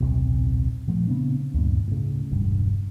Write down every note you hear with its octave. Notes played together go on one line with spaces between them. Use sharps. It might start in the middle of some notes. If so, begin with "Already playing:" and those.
D#1 B1 C3
A#2 F3 A3
C#3 B3 C4 D4
D2 G2 A#2
A2 C#3
E1 C#2 G2